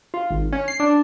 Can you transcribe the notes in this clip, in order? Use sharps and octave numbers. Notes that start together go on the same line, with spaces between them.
F4
G#1
C#4
C7
D4